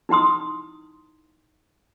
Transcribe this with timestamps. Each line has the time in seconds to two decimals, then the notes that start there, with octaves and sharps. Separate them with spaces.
0.09 D#4 E4 G5 C6 D#6